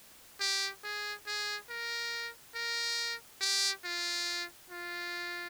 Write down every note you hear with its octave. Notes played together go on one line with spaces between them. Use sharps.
G4
G#4
G#4
A#4
A#4
G4
F4
F4